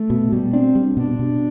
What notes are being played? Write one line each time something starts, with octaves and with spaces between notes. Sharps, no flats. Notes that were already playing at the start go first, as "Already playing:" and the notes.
Already playing: A3
B2
B2 G3
C4 D4
G3
B2 D4
B2